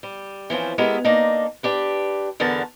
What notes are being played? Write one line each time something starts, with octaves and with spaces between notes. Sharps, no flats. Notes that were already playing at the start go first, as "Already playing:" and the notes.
G3
E3 F3 C4 C#4
G#3 B3 E4 G4 A#4
A#3 D4 D#4
D4 G4 B4
E2 D3 B3 A#4 A5